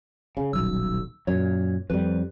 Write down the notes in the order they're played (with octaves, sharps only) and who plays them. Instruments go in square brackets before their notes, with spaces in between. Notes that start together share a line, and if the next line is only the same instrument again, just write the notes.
[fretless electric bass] C#3
[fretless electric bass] D#1 B1 [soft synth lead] E6
[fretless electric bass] F#2 A#2 [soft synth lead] C#5
[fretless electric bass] F2 G3 [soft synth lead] B4